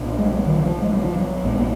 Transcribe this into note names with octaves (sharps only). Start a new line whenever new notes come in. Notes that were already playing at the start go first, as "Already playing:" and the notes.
Already playing: B1 A#2
G#3
F#3
D#3
F3
F3
G#3
F#3
F3
F#3
A#1 G#2 G#3
A#3